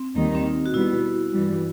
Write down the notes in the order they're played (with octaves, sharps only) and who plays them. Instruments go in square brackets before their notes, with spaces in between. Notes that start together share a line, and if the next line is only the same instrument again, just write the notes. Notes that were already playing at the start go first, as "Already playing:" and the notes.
Already playing: [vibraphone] C4
[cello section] D#2 D#3 G3 D#4
[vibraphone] C4
D#4
F#4
[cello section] B2 G3 B3 [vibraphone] E4
[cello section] G2 E3 G3